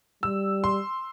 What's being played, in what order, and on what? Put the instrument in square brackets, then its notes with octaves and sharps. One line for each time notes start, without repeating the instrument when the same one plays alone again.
[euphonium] G3 [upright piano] E6
[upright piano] C6